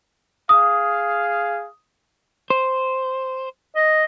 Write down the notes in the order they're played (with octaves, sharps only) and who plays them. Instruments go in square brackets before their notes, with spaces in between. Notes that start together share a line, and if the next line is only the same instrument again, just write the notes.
[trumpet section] G#4 F5 [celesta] D#6
[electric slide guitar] C5
[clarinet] D#5